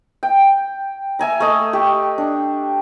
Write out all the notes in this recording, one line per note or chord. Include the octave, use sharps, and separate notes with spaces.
G5
E5 G#5 A#5
A3 D#5
G4
D4